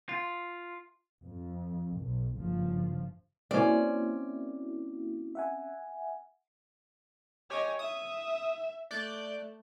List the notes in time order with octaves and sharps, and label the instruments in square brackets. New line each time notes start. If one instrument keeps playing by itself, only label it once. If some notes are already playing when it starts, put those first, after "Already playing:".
[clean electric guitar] F4
[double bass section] F2
B1
F#1 G2 C#3 F3
[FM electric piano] A#3 E4 F#4 [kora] C4 C#4 [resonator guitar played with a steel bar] D5
[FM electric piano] E5 F#5 G#5
[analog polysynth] G4 G#5 [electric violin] C#5 D#5
[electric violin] E5 [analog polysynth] D#6
[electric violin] A3 [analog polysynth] D5 F#6 G6